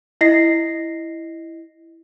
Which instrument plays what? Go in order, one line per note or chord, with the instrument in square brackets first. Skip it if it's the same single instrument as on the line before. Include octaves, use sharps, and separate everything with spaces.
[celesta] E4 D#5 A#6 C7